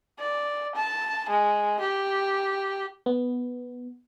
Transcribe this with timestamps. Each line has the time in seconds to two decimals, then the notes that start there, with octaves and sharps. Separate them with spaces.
0.19 D5
0.75 A5
1.29 G#3
1.80 G4
3.06 B3